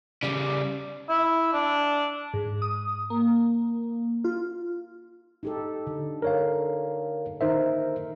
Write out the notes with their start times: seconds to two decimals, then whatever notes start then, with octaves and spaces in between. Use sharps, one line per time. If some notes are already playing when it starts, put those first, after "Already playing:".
0.23 C#3 G3 D5
1.09 E4
1.53 D4
2.34 G#2
2.62 D#6
3.10 A#3
4.24 F4
5.43 D#4 G4 A4
5.87 D3
6.22 A#4 C#5 F5
7.41 D#3 D#4 A#4 C5 E5